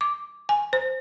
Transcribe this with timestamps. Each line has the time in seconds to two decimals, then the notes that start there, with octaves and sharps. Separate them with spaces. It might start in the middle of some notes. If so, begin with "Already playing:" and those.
0.01 D6
0.49 G#5
0.73 C5